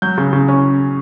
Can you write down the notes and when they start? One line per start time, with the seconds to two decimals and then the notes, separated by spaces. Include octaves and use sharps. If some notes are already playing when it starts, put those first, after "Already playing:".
0.02 F#3 G6
0.18 C#3
0.33 C#3
0.48 C#4